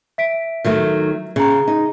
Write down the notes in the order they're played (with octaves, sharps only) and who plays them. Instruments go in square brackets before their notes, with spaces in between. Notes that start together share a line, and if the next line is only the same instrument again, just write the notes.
[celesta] E5 B6 D7
[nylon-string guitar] D#3 F#3 A3
[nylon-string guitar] C#3 [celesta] G#4 A#5
[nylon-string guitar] D#4